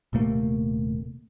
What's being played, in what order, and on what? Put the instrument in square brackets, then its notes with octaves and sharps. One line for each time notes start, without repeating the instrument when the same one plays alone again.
[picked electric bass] D#1 C3 A3 A#3